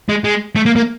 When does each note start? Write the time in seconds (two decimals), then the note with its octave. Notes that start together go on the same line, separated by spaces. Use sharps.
0.09 G#3
0.24 G#3
0.56 A3
0.66 A#3
0.76 A#3